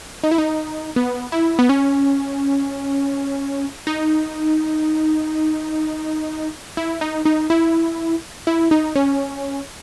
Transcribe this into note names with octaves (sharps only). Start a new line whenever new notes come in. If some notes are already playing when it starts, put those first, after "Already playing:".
D#4
E4
D#4
B3
E4
B3
C#4
D#4
E4
D#4
D#4
E4
E4
D#4
C#4